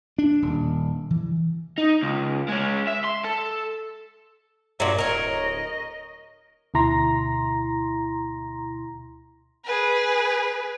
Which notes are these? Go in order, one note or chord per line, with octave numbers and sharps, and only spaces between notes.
D4
D#1
E3
D#4
C#2
G#3 C#4
E5
C6
A4
G2 A#2 F#3 E5
D1 A#4 C#5 D#5
D2 B2 E4 A#5 C6 A#6
G#4 B4